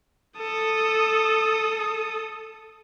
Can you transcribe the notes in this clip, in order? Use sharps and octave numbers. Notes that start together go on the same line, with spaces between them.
A4 D#6